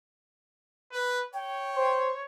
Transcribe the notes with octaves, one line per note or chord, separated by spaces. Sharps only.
B4
C#5 G5
C5